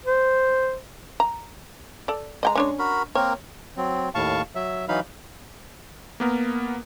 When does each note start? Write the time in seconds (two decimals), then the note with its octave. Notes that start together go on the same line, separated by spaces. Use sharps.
0.05 C5
1.20 A#5
2.08 A4 D5
2.43 G#3 D#5 G5 A#5
2.55 C#4 D4 C#5
2.79 F#4 A#4 B5
3.15 A#3 C4 A#4 C#5
3.77 F#3 C4
4.15 D#2 A2 F5 A5 C#6
4.55 F#3 E5
4.89 E3 F#3 D#4 F5 B5
6.20 A#3 B3 A#4